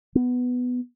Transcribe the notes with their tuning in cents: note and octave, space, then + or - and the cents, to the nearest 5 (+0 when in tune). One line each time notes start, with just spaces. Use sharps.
B3 +5